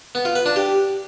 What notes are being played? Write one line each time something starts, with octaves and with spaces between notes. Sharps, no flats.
B3
F4
B4
D4
G4